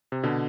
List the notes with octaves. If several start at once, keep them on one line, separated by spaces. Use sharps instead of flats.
C3
B2 D3